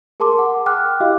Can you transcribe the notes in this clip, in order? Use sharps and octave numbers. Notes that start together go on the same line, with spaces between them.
G#4 A#4 A5 C6 D6
F#5
G5 D6 F6 F#6
E4 F#4 G4 D#5 F5